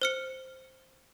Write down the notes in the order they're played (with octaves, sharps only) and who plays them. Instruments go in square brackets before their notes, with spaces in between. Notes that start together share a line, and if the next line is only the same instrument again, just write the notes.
[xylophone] C5 F6 C#7